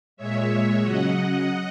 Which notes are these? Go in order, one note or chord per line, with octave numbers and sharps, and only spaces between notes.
A#2 G#3 C#5 E5
C#3 F#3 D#5 F#5